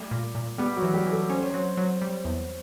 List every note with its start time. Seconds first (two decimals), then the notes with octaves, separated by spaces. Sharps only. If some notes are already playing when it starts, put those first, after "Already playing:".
Already playing: G3 A3 G4
0.11 A#2
0.35 A#2
0.58 G3 B3 G4
0.76 F#3 F#4
0.82 E3
0.94 G3 G4
1.06 E3
1.11 A3 A4
1.30 C#4 C5
1.40 C#5
1.51 F#3 C4 C5
1.77 F#3
2.02 G3
2.25 E2